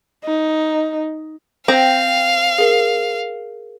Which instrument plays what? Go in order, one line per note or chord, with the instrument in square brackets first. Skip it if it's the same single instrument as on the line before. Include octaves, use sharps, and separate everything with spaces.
[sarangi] D#4
[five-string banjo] C4 [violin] F5 [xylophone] G5 A#6
[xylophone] G#4 A#4 C7